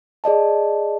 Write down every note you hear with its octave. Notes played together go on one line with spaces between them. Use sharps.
G#4 D5 D#5 A5